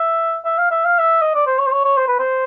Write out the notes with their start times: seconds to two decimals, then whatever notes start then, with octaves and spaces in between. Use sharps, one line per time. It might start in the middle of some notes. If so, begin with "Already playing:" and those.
Already playing: E5
0.45 E5
0.58 F5
0.71 E5
0.85 F5
0.98 E5
1.22 D#5
1.34 D5
1.47 C5
1.59 C#5
1.67 C5
1.72 C#5
1.84 C#5
1.97 C5
2.08 B4
2.19 C5